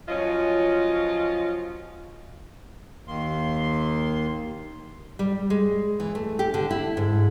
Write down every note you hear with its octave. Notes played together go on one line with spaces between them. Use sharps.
F3 F#3 C#4 F4 D#5
D#2 D#3 A#3 C6
G3
G#3
E3
A3
G4
D3
E4
G#2